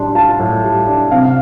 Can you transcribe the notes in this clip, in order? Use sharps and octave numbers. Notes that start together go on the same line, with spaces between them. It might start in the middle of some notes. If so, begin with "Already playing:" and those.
Already playing: A2 G3 D4 C6
F4 A5
A2
G3
D4
C3 F5
F5